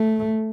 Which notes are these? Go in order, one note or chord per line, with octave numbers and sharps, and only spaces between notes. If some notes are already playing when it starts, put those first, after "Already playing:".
Already playing: A3